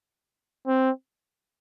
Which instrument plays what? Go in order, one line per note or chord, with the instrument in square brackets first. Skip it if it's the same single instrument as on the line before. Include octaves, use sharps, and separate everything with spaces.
[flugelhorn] C4